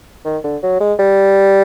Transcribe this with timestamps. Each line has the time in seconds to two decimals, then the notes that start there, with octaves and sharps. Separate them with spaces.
0.25 D#3
0.44 D3
0.63 F#3
0.81 G#3
0.99 G3